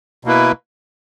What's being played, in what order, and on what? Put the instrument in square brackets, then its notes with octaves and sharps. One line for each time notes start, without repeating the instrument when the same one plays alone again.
[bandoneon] B2 A#3 E4 B4